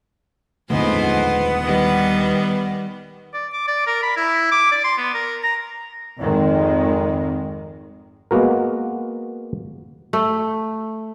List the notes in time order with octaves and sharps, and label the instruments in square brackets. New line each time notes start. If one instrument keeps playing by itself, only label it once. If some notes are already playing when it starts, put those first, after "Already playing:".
[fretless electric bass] D#1 D3 A3 [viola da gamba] F2 G#2 C5 [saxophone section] B3
[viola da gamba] D#3 G3
[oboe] D5
D6
D5
A#4
B5
E4
D6
D5
C6
B3
A#4
A#5
[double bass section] G#1 F2 D#3 G#3
[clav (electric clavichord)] G#3 A#3 B3 F#4 A#4
[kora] A3